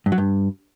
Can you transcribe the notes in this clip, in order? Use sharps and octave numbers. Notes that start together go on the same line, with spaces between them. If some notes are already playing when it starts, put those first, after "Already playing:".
G2
F#3
G2